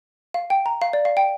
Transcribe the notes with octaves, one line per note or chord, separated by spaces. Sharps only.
F5
G5
A#5
F5
D5
F5
G5